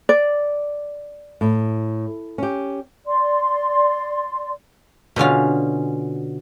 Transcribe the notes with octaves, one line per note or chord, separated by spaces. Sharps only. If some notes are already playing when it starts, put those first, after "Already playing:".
D5
A2
C#4 G4
D5 C6
B2 D3 C#4 F4